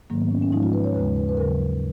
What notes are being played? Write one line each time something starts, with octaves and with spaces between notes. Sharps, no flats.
G#2 D#3 F#3 A#3
B3
C#4
C#4
G#2 F3 G#3 D#4
F4
B4
C#5
D#2 C#3 G#3 B4
B4
B4
D#2 C#3 F#3 A#4